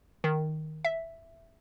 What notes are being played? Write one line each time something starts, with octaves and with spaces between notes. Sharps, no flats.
D#3
E5